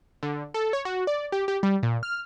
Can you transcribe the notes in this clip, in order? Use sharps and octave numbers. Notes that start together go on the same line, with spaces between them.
D3
A4
C#5
F#4
D5
G4
G4
G3
A#2
F6